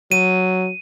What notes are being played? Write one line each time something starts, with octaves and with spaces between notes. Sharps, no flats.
F#3 D#7